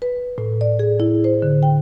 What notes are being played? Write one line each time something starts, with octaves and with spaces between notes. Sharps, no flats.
B4
A2
D5
G#4
E4
C5
D3
G5